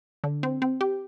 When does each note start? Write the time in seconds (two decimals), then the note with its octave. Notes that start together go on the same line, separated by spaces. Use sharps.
0.24 D3
0.43 C4
0.62 C4
0.81 G4